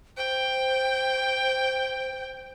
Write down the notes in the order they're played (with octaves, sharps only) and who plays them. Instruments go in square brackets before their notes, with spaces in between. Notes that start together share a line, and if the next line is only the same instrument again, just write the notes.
[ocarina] C5 [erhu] G5